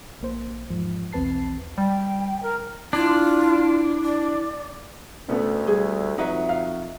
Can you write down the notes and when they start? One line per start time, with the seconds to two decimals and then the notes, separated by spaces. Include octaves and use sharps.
0.21 A#1 A#3 C5
0.70 E2 G#2 F3
1.13 B1 E2 C4 B4 A5 C7
1.78 G3 G5
2.43 A#4
2.93 D4 E4 F4
4.03 D5
5.29 D2 B2 A3 B3 C#4
5.67 G3 G#4
6.18 F2 F#3 D#4 B4 E5
6.49 F5